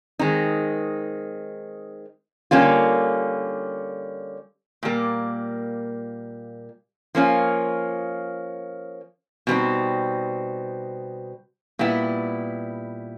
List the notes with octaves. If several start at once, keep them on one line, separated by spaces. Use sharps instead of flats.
D#3 G#3 C4 D#4
D3 G3 A#3 C#4 F4
A#2 G3 A#3
F3 A#3 C#4 F4
B2 G3 C4 D#4
A#2 G3 B3 E4